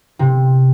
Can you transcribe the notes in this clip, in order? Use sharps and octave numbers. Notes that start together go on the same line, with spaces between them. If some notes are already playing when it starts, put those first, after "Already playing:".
C3